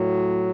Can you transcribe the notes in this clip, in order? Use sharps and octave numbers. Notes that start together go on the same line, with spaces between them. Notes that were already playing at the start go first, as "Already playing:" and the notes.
Already playing: A2 F#3